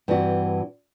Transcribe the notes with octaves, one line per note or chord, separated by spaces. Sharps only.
G2 E3 C4 F#4